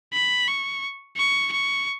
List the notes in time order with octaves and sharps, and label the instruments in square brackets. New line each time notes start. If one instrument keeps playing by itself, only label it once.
[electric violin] B5
C#6
C#6
C#6